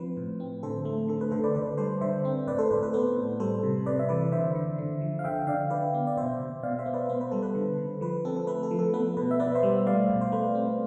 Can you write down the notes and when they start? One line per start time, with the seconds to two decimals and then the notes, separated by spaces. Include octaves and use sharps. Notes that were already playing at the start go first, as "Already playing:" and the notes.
Already playing: F3 C4 B4 C5
0.17 A2
0.40 C4
0.63 D3 A4 C5
0.85 A3
1.08 D3 A4
1.21 B4
1.31 D3 A4 C5
1.44 B4 D5
1.55 D3 B4 D5
1.78 G3 A4 C5
2.01 D3 C5 E5
2.25 C4
2.47 A2 B4 D5
2.58 A4 C5
2.71 A2 B4
2.83 B4
2.93 B3 A4 C5
3.17 A2
3.40 G3 A4 C5
3.63 C3
3.86 C3 B4 D5
3.99 E5
4.09 E3 B4 D5
4.32 D3 C5 E5
4.55 D3
4.79 D3
5.01 F3
5.19 F5
5.24 D3 E5 G5
5.47 D3 D5 F5
5.70 D3 B4 D5
5.94 B3
6.07 D5
6.17 B2 C5 E5
6.40 B2
6.63 B2 D5 F5
6.79 C5 E5
6.86 B3
6.94 B4 D5
7.09 B3 C5
7.21 B4
7.31 G3 A4
7.43 B4
7.55 D3
7.78 D3
8.01 F3 B4
8.25 C4 A4
8.37 A4
8.47 A3 B4
8.63 A4
8.71 F3
8.79 A4
8.94 B3 B4
9.17 B2 B4
9.31 E5
9.40 B3 B4 D5
9.55 C5 E5
9.63 G3
9.86 A3 D5 F5
10.10 B2
10.21 C5
10.32 A3 B4
10.55 C4